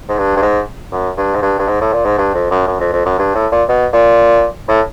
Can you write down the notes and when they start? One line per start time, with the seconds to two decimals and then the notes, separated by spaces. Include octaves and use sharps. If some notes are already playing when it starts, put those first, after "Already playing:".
0.09 G#2
0.18 G2
0.37 G2
0.42 G#2
0.92 F#2
1.17 G2
1.35 G#2
1.42 G2
1.59 G2
1.68 G#2
1.81 A2
1.93 A#2
2.05 G#2
2.18 G2
2.34 F2
2.51 F#2
2.67 F#2
2.80 F2
2.93 F2
3.06 F#2
3.19 G2
3.35 A2
3.52 A#2
3.69 B2
3.93 A#2
4.68 A2